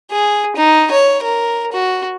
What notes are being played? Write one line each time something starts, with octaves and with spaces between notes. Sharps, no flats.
G#4
D#4
C#5
A#4
F#4